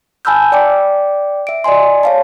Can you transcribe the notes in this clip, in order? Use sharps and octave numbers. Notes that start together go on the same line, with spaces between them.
G#5 A5 B5 E6 F6 G6
D5 G5 D6
E5 D7
D5 D#5 G#5 C6
C#5 F5 A5